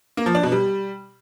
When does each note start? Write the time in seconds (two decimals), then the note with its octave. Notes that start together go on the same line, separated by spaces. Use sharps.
0.17 A#3
0.26 F3
0.35 D4
0.43 B2
0.52 G3